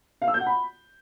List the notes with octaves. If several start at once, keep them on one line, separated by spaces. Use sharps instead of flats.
F5
E6
G6
F#5
B5